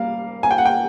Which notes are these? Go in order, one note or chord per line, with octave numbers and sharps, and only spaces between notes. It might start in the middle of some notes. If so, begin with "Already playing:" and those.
Already playing: G3 A#3 F5
G#5
G5
F#5
G5